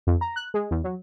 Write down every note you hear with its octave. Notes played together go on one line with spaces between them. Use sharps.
F2
A#5
F#6
G#3
E2
F#3